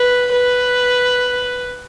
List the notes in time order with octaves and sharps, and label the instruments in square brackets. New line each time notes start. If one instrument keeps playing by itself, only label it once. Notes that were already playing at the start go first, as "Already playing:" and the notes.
Already playing: [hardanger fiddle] B4
B4